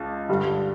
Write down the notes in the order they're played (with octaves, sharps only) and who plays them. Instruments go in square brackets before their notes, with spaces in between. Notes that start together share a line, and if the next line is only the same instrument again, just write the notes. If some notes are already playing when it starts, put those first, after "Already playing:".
Already playing: [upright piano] C#2 A5
G2 D3 G3